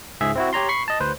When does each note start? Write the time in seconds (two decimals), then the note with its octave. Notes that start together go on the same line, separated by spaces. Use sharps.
0.21 C#2 G#2 G#4 E5
0.35 C4 E4 F#4
0.53 G4 C#5 A#5 C6
0.69 B5 C#6 C7
0.88 D#5 A5
1.00 D2 B4 C5